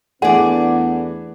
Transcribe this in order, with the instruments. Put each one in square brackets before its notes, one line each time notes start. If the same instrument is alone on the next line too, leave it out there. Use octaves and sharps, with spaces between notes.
[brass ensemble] E2 B3 [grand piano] E3 A3 D4 [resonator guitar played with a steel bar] G#4 D5 [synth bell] F#5